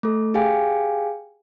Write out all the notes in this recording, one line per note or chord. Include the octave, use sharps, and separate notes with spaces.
A3 A4
G4 G#4 F5 G5 G#5